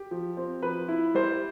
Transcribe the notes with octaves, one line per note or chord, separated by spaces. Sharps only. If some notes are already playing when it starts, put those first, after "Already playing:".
Already playing: G4
F3
C4
F3 B4
E4
G3 C5